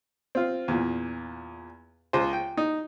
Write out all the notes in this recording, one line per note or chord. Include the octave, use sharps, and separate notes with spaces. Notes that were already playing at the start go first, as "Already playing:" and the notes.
C4 F4
E2 A#2
C#2 C5
G5
D#4